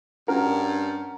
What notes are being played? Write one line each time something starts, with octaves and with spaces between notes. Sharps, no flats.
G2 C#4 F#4 A#4